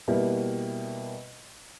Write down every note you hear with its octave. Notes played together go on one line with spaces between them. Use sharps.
B2 G3 A#3 E4